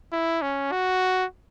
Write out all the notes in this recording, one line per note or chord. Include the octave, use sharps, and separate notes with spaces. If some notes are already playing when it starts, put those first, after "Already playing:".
E4
C#4
F#4